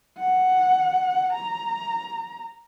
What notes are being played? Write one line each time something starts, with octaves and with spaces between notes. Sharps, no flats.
F#5
A#5